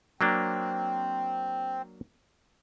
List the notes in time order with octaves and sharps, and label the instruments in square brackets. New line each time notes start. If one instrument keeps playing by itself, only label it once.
[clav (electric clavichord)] F#3 A#3 D4 [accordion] C4